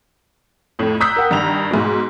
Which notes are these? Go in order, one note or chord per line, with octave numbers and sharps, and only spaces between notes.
F2 A2
A#5 D#6 E6 F#6 G6 B6
A#4 F#5 G5
G2 D#3 A#5 F7
G#2 B2